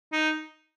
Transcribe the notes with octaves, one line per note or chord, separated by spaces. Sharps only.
D#4